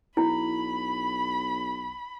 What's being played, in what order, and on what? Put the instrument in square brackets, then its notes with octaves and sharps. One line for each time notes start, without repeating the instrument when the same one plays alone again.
[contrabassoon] B1 [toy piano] E4 [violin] B5